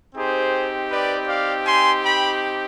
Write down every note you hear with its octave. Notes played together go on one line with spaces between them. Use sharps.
C4 D#4 G4 G#4 C5
B4 D5
D5 F5
G#5 C6
G5 B5